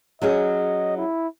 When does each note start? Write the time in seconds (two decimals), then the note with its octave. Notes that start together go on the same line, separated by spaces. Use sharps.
0.22 F#3 C#4 G#4 D#5
0.97 E4